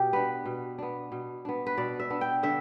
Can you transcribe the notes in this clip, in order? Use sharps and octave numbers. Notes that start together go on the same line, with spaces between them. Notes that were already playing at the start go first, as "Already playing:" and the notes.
Already playing: B2 G4
B3 D4 B4
B2
B3 D4
B2
B3 D4
B4
B2 D5
E5
B3 D4
G5
D3 E5